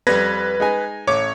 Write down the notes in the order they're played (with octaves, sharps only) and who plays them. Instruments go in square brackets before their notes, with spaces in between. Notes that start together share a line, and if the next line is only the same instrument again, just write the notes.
[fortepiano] F2 G3 [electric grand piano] B4 G#6 A#6
[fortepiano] G#3 D#4 G#5
[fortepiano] A1 D6 [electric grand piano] C#5